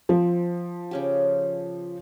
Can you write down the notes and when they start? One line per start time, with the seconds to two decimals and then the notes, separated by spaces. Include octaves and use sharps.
0.09 F3 C4
0.91 C#3 C#4 G4